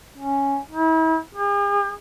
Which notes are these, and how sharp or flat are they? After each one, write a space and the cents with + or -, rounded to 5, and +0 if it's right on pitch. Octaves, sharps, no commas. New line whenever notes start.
C#4 +0
E4 -40
G#4 -45